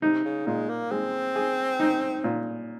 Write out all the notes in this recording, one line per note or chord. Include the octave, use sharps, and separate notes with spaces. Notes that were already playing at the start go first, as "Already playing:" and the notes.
C3 D#4
C#3
A#2 G#3
A#3
G#3 C4
G#4
D#4
A#2